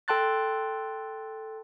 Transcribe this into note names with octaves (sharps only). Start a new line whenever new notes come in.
A4 G5 A5 C6 F#6 A6